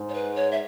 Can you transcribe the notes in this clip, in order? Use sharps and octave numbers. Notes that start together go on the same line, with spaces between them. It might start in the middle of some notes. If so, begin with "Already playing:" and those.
Already playing: G#2
C#5
B4
C#5
E5